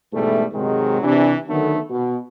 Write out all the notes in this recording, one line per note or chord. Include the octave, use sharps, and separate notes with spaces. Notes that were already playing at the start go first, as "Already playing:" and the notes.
G#2 B2 E3 G3 A3
G#2 C3 D#3 F#3 G#3
C3 E3 D4
D3 D#3 F#3 A3 B3
B2